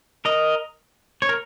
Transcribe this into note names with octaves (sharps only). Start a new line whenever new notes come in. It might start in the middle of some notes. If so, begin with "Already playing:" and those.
A#4 D#5
C#5
A#4